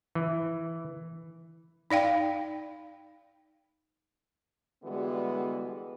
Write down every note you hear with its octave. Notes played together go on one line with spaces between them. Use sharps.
E3
D#4 D5 F5 G5
D3 E3 G3 G#3 B3 F#4